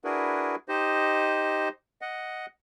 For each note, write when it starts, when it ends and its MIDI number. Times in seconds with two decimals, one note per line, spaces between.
0.04 0.55 62
0.04 0.55 64
0.04 0.55 66
0.04 0.55 68
0.04 0.55 70
0.04 0.55 71
0.68 1.69 63
0.68 1.69 67
0.68 1.69 72
0.68 1.69 75
2.01 2.46 75
2.01 2.46 78